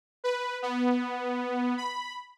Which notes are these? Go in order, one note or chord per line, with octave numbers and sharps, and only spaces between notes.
B4
B3
B5